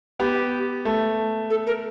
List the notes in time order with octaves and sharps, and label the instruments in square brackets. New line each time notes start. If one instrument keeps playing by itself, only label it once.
[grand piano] B3 [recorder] G4
[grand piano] A3
[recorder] A4
A#4